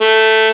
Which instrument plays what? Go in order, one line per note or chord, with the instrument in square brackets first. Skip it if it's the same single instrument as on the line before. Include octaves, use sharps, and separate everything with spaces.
[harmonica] A3